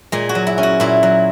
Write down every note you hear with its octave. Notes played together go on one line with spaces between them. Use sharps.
A#2 G#3 G#4
F#4
F#3
E4
C#4
F#4
A#2 E4
F#3